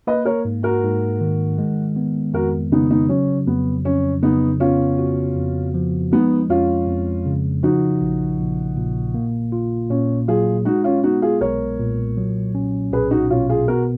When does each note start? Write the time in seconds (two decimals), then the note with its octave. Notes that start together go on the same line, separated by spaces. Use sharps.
0.07 A#3 B4 D#5
0.25 A#4 C#5
0.45 G#2
0.63 F#4 A#4
0.83 G#2
1.21 D#3
1.58 G#3
1.96 B3
2.34 F2 F#4 A#4
2.72 C#3 B3 D#4
2.90 B3 D#4
3.09 F#3 C#4
3.47 F2 B3
3.85 F2 C#4
4.23 C#3 B3 D#4
4.60 B3 C#4 F4
4.99 F#4
5.36 F2
5.74 F3
6.12 G#3 B3 D#4
6.50 F2 C#4 F4
6.87 F2
7.26 C#3
7.63 F3 D#4 F#4
8.01 A#1
8.39 A#1
8.77 A#2
9.14 A#3
9.52 F4
9.90 A#2 C#4
10.28 F#3 F4 G#4
10.65 G#3 D#4 F#4
10.84 C#4 F4
11.03 B3 D#4 F#4
11.22 F4 G#4
11.41 B1 A#4 C#5
11.79 A#2
12.17 F#3
12.55 C#4
12.93 B1 G#4 B4
13.11 D#4 F#4
13.30 B2 C#4 F4
13.49 F4 G#4
13.68 B3 F#4 A#4